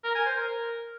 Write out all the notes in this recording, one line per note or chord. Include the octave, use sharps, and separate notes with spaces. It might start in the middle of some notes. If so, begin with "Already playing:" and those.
A#4
G#5
C5
A#4